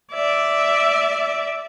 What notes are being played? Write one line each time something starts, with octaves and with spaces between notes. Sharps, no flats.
D5 E5